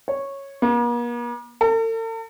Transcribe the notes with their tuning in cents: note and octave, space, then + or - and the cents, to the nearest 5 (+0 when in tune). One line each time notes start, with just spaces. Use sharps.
C#5 -10
A#3 +45
A4 +45